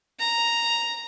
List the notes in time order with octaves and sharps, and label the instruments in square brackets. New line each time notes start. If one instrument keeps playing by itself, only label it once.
[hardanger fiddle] A#5